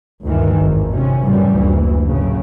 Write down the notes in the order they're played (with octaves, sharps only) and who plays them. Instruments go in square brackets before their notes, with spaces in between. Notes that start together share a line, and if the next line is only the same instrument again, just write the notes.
[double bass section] D2 G2 D#3 E3
G#1 E2
C3 C#4
F#2 A2 C#3 E3 G3
F#1 D2 E3
F#2 A2 C#3